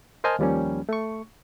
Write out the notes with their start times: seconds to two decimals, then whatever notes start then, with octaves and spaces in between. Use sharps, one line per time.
0.24 A#4 C5 D#5 G#5 A5 F6
0.39 D#2 F3 G3 A#3 C#4
0.89 A3 C#6